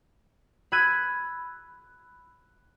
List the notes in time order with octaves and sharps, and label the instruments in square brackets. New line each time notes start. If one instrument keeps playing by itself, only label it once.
[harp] B5 E6 F#6 G#6 D#7